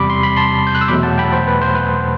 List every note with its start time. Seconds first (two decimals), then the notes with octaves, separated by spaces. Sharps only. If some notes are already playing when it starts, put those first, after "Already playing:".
Already playing: E2 C3 G3 B5 D6
0.10 C6
0.23 B5
0.36 A5 C6
0.67 G6
0.75 F#6
0.81 E6
0.88 E2 B2 F#3 A3 B5 D6
1.03 F#5 A5
1.18 G5 B5
1.33 C5
1.48 B4
1.62 C5
1.75 B4